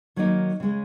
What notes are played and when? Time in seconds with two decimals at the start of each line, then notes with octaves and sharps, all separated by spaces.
0.16 D#3 F#3 A#3 D#4 A#4
0.60 C#3 G#3 C#4